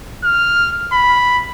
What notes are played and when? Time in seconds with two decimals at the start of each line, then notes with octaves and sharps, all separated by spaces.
0.24 F6
0.93 B5